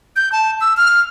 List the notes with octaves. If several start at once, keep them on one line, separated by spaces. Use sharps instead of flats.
G6
A5
E6
F6